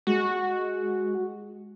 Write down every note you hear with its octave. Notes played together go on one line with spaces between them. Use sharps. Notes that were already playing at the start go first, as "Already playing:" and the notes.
G#3 F#4